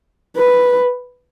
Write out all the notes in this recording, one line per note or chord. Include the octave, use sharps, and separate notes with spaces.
B4